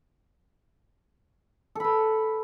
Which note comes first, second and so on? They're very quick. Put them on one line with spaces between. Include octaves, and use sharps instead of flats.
A4 B5 B4